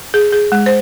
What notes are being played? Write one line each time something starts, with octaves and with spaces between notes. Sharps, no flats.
G#4
G#4
G#3
C5